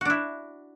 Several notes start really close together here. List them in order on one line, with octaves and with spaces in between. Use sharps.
F#4 D4 E4